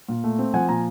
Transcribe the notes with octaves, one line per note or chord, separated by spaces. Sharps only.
A#2
A3
C4
F3 F#5 G#5
A#2 G#5 A#5